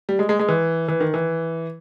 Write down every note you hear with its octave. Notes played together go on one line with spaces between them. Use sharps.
G3
G#3
G#3
G#3
E3
E3
D#3
E3